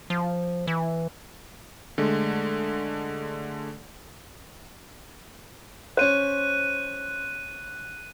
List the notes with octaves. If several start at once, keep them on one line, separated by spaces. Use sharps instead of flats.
F3
E3
D3 G#3 A3
C#4 C5 F#6 D#7